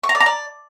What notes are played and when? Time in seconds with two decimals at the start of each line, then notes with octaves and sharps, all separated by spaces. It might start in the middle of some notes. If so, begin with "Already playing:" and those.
0.03 C#6
0.09 A#5
0.15 D5
0.20 A#5
0.26 D5